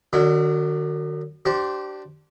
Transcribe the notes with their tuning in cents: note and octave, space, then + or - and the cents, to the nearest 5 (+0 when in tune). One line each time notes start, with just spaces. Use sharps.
D#3 -45 F#3 +0 D4 -30
D4 +5 G4 -25 C5 +0